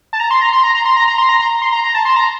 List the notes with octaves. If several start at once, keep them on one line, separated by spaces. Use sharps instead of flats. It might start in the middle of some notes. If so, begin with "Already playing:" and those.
A5
A#5
C6
A#5
C6
A#5
A#5
C6
A#5
A#5
C6
A#5
A#5
C6
A#5
A#5
A5
C6
A#5